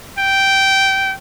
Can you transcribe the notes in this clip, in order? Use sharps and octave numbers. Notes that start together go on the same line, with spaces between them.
G5